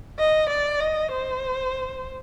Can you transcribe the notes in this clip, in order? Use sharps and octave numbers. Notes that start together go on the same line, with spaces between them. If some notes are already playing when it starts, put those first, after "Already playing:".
D#5
D5
D#5
C5